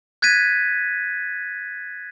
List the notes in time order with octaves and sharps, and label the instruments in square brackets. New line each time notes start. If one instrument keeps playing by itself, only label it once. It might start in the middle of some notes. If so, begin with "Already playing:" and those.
[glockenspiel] F#6 G#6 A6 B6 D#7